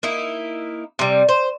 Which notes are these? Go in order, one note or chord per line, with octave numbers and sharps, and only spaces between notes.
A#3 D#4 E4
C3 G3
C5